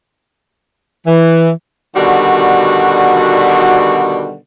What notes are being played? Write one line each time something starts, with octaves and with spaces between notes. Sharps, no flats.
E3
B2 D3 D#3 G3 F#4